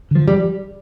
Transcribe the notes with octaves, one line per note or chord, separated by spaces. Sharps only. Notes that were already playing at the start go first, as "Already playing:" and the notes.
D3 F3
G3